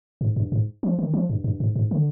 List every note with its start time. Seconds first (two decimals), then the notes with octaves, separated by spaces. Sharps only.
0.21 G#2
0.36 G2
0.52 G#2
0.83 F3
0.99 D#3
1.14 F3
1.29 G2
1.44 G2
1.60 G#2
1.76 G#2
1.91 D3